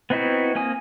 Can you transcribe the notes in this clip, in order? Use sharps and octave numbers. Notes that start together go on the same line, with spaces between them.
B3 C4 D#4 E4 F#4
A#3 C4 G#5 D#6